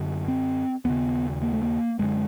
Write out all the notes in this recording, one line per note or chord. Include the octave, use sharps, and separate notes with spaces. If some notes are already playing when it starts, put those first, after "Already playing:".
Already playing: F#2 D3
C4
D#2 C#3 B3
A#3
A3
A#3
F#2 D3 G#3